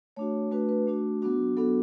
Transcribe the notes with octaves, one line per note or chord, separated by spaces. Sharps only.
A3 D4 F#4 C#5
A3 D4 F#4 B4
B4
A3 D4 F#4
F#3 B3 D4 F#4
F#3 B3 D4 F#4 A4